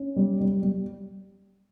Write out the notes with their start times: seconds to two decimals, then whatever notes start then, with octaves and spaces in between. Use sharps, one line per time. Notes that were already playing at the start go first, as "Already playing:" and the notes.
Already playing: C#4
0.16 G3
0.40 G3
0.63 G3